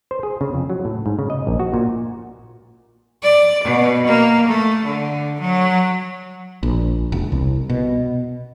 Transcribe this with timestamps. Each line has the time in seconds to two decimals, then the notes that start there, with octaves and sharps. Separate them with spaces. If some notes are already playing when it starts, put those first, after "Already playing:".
0.11 C5
0.23 G#4
0.41 C#3
0.53 F2
0.70 F#3
0.85 A2
1.06 G#2
1.19 C#3
1.30 D#5
1.47 A#1
1.60 F#4
1.74 A#2
3.23 D5
3.64 B2
4.07 A#3
4.48 A3
4.85 D3
5.40 F#3
6.63 A#1
7.12 E1
7.32 C2
7.70 B2